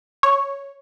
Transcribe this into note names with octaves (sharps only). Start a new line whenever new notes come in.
C#5